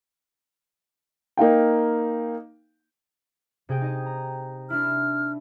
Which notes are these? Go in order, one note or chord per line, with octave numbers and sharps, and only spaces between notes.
A#3 D#4 F5 G5
C3 G#4 G5
D#4 D#5
A#5
D4 E4 F6